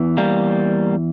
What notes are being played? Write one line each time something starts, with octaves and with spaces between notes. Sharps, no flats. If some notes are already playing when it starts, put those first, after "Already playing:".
Already playing: E2 E3
G3 A#3